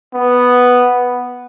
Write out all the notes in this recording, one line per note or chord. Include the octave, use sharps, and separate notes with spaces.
B3